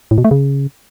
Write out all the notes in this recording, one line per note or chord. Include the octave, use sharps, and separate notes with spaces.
A2
B2
A3
C#3